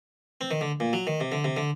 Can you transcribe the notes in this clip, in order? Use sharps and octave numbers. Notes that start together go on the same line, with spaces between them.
C4
D#3
D3
A#2
F#3
D#3
C3
D3
C3
D3